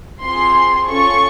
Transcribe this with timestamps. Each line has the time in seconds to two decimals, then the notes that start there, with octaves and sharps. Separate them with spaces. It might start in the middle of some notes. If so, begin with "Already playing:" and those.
0.24 C4 F4 G#4 C6
0.88 C#4 F4 A4 C#6